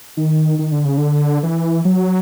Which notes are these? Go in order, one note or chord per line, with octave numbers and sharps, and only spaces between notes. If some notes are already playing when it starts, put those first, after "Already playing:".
D#3
D#3
D3
C#3
D3
E3
F#3